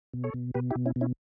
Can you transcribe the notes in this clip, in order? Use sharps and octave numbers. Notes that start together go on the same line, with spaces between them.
B2
A4 C#5
B2
B2 G4 B4
E4 G4
B2
C#4 E4
B2
C#4 E4